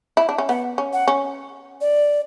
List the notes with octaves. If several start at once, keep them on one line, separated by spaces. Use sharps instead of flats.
E4
D4
C#4
B3 F#5
C#4
F#5
C#4
D5